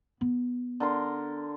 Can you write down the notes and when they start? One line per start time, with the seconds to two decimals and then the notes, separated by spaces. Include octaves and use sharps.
0.21 B3
0.80 D3 A#4 C6